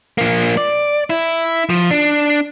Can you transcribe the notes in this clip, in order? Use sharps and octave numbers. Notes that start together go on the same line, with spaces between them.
F3 A#3
D5
E4
F3
D4